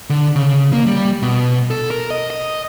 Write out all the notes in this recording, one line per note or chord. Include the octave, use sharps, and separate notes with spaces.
D3
C#3
A#3
G3
B2
A4
A#4
D#5
D#5